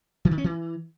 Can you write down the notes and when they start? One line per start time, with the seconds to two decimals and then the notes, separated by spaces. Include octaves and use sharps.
0.25 E3
0.31 D#3
0.38 C#4
0.44 E3